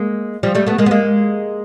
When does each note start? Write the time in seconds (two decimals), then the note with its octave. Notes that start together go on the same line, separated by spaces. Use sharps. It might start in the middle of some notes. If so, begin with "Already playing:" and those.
Already playing: G#3 A#3
0.43 F3 G3
0.55 G3 A3
0.67 A3 B3
0.78 G#3 A#3
0.86 B3
0.91 G#3 A#3